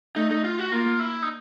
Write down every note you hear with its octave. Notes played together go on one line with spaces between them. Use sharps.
A3 D#4
D#4
F4
F#4
A#3 F4
E4
D#4